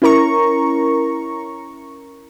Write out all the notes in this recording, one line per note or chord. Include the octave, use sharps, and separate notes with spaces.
C#4 E4 A#4 A#5 C#6